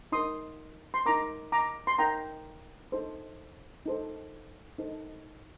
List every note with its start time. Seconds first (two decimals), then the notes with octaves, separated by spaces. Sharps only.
0.12 D#4 A#4 C6 D#6
0.94 C6
1.06 D#4 A#4 A#5 D6
1.52 A#5 D6
1.87 C6
1.98 D#4 A#4 G5 A#5
2.92 D#4 A4 C5
3.86 D#4 A4 C5
4.78 D#4 A4 C5